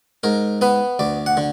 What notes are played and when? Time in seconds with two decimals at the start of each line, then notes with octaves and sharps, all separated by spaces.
0.23 G#2 A#4
0.61 B3 B4
0.99 D2 D5
1.26 F#5
1.37 D3